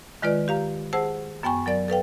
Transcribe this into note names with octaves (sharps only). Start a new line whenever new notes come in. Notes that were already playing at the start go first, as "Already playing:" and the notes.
D#3 G#3 F4 B4 D5
G4 F5 A#5
G#4 C5 F#5 A5 E6
F#2 B3 G5 G#5 C#6
F#3 A#4 D5 A6
A4 B4 F5 G5